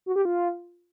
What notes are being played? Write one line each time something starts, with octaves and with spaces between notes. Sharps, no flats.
F#4
G4
F4